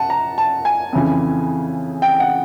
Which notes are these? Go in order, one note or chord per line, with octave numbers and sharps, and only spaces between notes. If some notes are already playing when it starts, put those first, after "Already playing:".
Already playing: F#5 A5
A#5
A5
G#5
F2 C#3 E3
G5
F#5